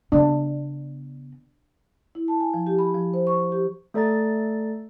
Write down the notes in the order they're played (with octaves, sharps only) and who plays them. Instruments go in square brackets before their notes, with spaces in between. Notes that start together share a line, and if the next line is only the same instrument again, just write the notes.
[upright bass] C#3 B3 [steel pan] D4
[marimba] E4
A5
G#5
F3
G4
B5
F3
C5
C#6
G4
[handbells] A3 A4 D5 A#5 A6